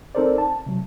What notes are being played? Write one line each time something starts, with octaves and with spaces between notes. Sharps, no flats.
C4 D#4 A4 A#4 C5 D5
A5
C3 F#3